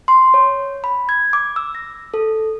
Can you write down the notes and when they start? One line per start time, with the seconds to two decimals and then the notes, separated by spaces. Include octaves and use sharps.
0.08 C6
0.34 C#5
0.84 B5
1.09 G#6
1.33 D6
1.56 E6
1.75 A#6
2.14 A4